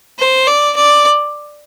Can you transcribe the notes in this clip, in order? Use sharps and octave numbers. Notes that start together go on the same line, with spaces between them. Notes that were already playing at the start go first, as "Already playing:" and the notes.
C5
D5
D5